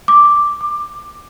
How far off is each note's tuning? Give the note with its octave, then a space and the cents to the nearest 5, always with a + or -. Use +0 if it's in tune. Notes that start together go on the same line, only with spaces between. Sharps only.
D6 +0
D6 +15